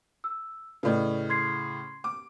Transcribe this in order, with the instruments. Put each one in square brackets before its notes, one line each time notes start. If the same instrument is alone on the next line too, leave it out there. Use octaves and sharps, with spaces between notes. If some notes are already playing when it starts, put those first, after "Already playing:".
[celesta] E6
[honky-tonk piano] A2 C#3 [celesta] B4 D5 D#5
[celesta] C6 G#6 C7
[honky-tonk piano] D6